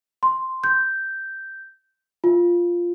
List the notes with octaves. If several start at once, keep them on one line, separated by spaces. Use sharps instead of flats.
C6
G6
F4